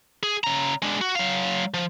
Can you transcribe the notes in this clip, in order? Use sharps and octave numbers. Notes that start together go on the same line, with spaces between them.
G#4
C#3 A#5
G#3 D4
F#4
F#3 F5
F3